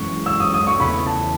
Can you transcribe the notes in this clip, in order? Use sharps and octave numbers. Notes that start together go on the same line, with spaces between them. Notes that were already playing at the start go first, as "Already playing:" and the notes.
Already playing: F#2 E3 G#3 C#4 C#6
E6
D#6
D#6
C#6
E2 C#3 E3 A3 B5
A5